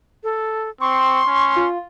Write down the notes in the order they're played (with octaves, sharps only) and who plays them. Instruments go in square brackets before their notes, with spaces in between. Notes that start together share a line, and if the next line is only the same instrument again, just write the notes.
[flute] A4
[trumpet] C4 [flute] C6 [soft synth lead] C#6
[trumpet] C#4
[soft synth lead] F4